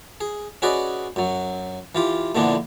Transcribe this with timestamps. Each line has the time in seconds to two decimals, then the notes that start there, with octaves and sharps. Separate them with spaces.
0.21 G#4
0.62 C#4 F#4 G#4 B4 D5 D#5
1.16 F#2 F#3
1.95 E3 F4 G4
2.35 F2 A#2 D3 E3 B3 D4